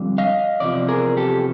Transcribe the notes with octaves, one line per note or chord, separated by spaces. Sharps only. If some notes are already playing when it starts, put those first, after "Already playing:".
Already playing: F2 D3 G3
D#5 F5
E2 C3 F3 D5
G#4 A#4
G4 A4